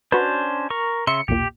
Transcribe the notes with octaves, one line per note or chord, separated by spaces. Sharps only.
C#4 D4 F#4 B4 C5
A#4 C#6
C#3 E5 C6 C#7
B1 E2 A#2 G4